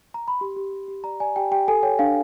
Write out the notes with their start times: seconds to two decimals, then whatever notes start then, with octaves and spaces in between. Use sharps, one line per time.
0.14 A#5
0.28 B5
0.41 G4 C6
0.57 G4
0.73 G4
0.88 G4
1.04 D5 A#5
1.20 D5 G#5
1.36 G4 G5
1.51 G4 G5
1.68 A4 G#5
1.83 C#5 G5
1.99 D4 F5